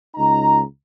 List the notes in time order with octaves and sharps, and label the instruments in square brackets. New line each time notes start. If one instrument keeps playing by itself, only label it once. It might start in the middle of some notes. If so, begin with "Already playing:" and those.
[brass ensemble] C#2 D#4 A#5